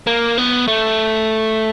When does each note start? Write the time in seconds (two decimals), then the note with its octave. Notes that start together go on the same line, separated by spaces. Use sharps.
0.07 A#3
0.38 B3
0.68 A3